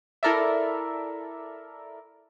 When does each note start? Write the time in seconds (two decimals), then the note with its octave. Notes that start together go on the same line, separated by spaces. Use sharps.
0.23 E4 A4 A#4 D5 E5